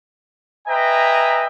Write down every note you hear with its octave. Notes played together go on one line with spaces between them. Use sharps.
B4 D#5 E5 G5 G#5 A#5